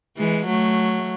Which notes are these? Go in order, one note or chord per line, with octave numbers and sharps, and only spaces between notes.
E3 G#3
F#3 A3